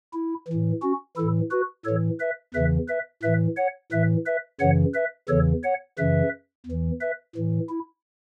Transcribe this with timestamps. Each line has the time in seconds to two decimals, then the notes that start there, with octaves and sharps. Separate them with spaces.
0.14 E4
0.48 E3
0.53 A2
0.82 C#4 F#4
1.17 A2 E3 E4 A4
1.51 F#4 B4
1.85 A2 E3 A4 C#5
2.20 B4 E5
2.54 E2 C#3 E3 B4 E5
2.88 B4 E5
3.23 A2 E3 B4 E5
3.57 C#5 F#5
3.92 A2 E3 B4 E5
4.26 B4 E5
4.60 F#2 C#3 E3 C#5 F#5
4.94 B4 E5
5.29 E2 C#3 E3 A4 C#5
5.64 C#5 F#5
5.98 F#2 C#3 E3 B4 E5
6.66 E2 E3
7.01 B4 E5
7.36 A2 E3
7.69 E4